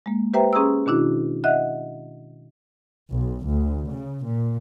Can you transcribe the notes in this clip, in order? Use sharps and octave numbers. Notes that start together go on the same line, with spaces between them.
G#3 A#3
G4 B4 C5 E5 G5 A#5
C#4 G#4 A#5 C6 D#6 E6
B2 D#3 D4 E4 F#4
D#5 E5 F#5 F#6
B1
D2
C#3
A#2